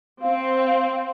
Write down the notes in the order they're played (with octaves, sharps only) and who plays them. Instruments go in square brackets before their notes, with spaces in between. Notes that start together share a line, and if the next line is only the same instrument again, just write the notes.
[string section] C4 [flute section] F5